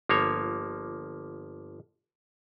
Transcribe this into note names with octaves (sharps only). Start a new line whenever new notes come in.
G1 F3 A#3 C#5